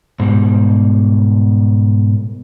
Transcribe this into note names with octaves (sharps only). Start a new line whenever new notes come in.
G#2 B2 G3